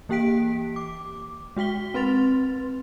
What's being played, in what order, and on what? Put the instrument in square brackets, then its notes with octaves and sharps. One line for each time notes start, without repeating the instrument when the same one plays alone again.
[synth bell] E3 A#3 G4 G5 B6 D7
D6
G#3 F#4 G5 B6 G7
C4 B4 C6 A6 F7